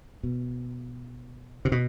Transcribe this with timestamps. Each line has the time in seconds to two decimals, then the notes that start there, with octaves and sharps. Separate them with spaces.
0.23 B2
1.65 C3
1.72 B2